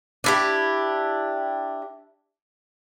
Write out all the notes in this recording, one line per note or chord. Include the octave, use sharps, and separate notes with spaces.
D4 E4 G4